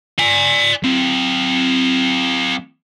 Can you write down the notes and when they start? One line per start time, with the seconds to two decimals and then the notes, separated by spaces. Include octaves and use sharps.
0.19 D5 G#5
0.83 F#3 C4